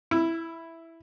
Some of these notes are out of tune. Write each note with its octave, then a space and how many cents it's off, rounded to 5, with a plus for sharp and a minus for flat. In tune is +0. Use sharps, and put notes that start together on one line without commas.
E4 +0 E6 +40